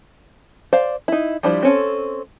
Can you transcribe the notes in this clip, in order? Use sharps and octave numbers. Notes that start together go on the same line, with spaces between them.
C5 D5 F5
D#4 E4
F3 G3 D4 E4 C5
C4 C#4 A4